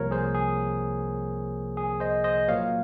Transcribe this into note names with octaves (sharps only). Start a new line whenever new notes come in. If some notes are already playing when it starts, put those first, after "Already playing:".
Already playing: C2 C3 F3 A#3 A#4 C#5
G#4 C5
G#4
G#4
C5 D#5
C5 D#5
A#2 F#3 A#3 C#5 F5